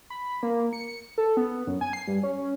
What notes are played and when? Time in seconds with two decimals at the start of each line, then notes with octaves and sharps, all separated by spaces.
0.10 B5
0.43 A#3
0.73 C#7
1.18 A4
1.37 B3
1.67 F#2
1.81 G#5
1.93 C7
2.07 G2
2.23 C#4